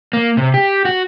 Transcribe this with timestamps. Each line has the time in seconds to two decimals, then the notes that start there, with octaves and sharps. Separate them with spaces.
0.13 A#3
0.37 C3
0.54 G4
0.85 F#4